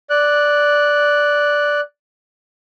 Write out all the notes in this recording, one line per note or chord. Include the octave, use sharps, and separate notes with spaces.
D5 F#6